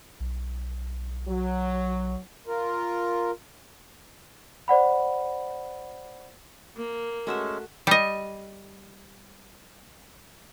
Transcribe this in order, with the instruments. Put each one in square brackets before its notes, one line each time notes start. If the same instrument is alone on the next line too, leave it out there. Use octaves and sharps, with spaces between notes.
[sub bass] B1
[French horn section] F#3
[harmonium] F4 A#4
[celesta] C5 D5 F#5 B5
[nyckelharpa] A#3
[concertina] G#3 C#4 [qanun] A3 F#4 E5
[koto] G3 D#5